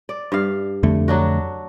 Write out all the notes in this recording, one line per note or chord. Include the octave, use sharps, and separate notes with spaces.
D5
G2 F5
F2 D3 A3
F#3 D4 F#4